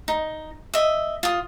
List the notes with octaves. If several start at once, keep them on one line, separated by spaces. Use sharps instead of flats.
D#4
D#5 E5
F4 D#6